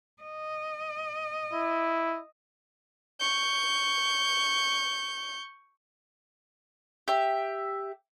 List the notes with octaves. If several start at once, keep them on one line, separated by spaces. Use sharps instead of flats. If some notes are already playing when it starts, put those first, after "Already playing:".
D#5
E4
C#6 G6
G4 E5